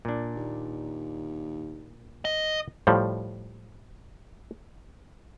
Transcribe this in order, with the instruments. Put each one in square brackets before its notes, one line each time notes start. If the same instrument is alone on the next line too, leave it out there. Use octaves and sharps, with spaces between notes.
[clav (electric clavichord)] A#2 D4
[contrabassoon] D#2
[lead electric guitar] D#5
[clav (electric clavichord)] A2 F3 G3